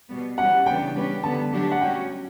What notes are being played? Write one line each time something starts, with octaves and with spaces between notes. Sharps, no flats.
B2 G3 B3
E3 G3 C#4 G4 F#5
C#3 E3 B3 D4 G5
G3 C#4 G4 B4
D3 G3 B3 A5
F#3 A3 D4 G4
F#5
G3 C#4 F#4 G5